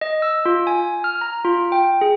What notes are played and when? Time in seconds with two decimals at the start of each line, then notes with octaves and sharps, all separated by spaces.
0.01 D#5
0.22 E6
0.46 F4
0.67 G#5
1.04 F6
1.21 A#5
1.45 F4
1.72 G5
2.01 G#4